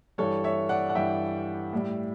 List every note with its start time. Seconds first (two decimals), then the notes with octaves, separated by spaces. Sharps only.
0.18 G2 E3 G3 A4 C#5
0.44 C#5 E5
0.69 D5 F#5
0.89 F#5
0.95 G2 E3 G3 E5 G5
1.73 A2 G3